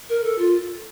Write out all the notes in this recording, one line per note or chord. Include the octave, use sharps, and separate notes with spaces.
A#4
A4
F4